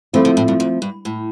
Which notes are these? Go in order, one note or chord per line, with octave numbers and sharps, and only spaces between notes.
E3 F3 A3 C4 F4
D3
A2
G2
F2
G2
A2